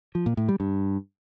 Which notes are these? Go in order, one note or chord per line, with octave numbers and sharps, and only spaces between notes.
F3
A#2
A2
G3
G2